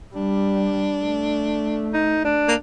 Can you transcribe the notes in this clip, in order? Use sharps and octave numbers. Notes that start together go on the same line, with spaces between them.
G3 D4
A3
D#4
D4
A#3